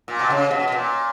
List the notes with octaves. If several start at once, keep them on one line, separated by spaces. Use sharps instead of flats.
A#2
B2
C#3
B2
B2
A#2